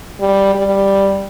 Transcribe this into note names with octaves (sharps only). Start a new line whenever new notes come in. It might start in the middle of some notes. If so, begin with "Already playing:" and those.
G3
G3